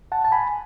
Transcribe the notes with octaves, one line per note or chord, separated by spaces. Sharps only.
F#5 A5
A5
G#5 B5